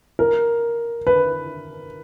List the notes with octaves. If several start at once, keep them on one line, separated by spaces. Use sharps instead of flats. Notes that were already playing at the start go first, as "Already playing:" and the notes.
A#4
B4